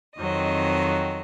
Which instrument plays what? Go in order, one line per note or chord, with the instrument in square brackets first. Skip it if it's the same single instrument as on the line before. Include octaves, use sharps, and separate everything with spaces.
[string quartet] F2 D#3 F#3 C4 D#5